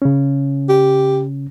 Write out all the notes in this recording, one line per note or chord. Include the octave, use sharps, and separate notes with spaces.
C#3 C#4
G4